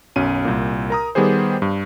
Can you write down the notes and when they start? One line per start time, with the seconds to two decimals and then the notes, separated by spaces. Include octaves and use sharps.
0.16 B1 F#2 C#4 D#7
0.45 C2 A#2
0.90 A#4 A#5 D#6
1.15 D#3 G3 B3 G4 G#4 C5
1.62 G2